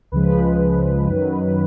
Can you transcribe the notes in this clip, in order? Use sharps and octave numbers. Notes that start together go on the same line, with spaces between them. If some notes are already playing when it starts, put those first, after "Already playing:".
C#2 C#3 F3 G#3 B4
F#2 D#3 F#3